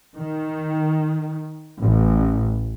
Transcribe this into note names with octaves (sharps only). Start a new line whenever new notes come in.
D#3
A1